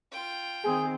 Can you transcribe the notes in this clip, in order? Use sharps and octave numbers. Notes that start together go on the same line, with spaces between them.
F4 G5
D#3 C4 G#4